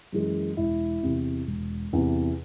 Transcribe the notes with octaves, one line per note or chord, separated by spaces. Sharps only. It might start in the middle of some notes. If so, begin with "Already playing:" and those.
F#2 E3 G#3
E1 E4
E2 C3
E1
E2 C3